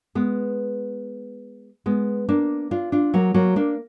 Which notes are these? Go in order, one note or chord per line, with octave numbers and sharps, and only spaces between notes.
G#3 B3
G#3 B3
A#3 D4
D4 F4
D4 F4
F#3 A#3
F#3 A#3
A#3 D4